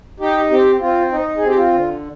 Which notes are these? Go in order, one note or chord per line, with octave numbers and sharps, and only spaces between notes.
D#4 G4
C4 G4
C4 F4
D#4
C4 G#4
G4
F4
D3